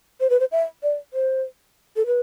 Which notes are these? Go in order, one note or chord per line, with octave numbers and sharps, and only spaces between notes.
C5
B4
C5
E5
D5
C5
A4
B4